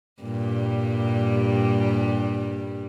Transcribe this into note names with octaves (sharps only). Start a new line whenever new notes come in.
G2 A#2 G3